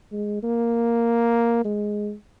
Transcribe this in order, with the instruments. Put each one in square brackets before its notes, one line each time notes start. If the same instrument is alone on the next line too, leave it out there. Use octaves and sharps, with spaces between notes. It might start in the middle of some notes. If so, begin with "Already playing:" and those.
[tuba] G#3
A#3
G#3